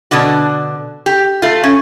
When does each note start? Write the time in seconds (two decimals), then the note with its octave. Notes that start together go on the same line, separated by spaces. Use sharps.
0.11 B2 D3 D4 F#4
1.06 G4
1.42 A3 F4
1.64 C#4